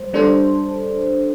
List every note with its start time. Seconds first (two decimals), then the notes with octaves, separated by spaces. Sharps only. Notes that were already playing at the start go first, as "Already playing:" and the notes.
Already playing: G3 C5
0.13 G3 D4 A4 C5